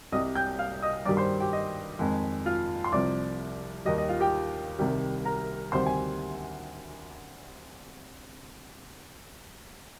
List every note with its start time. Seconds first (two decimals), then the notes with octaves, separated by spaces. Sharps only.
0.12 C2 C3 G3 D#5 D#6
0.35 G5 G6
0.59 F5 F6
0.82 D#5 D#6
1.05 G2 D#3 G3 D5 D6
1.17 C5 C6
1.40 G4 G5
1.53 D#5
1.99 F2 D#3 G#3
2.46 F4 F5
2.84 C6
2.92 C2 C3 F3 D5 D6
3.85 D#2 D#3 G3 D#5
3.98 D#5
4.09 F4 F5
4.20 G4 G5
4.79 C2 C3 D#3 G3
5.25 A#4 A#5
5.72 D2 C3 D#3 G3 C5 C6
5.86 G#5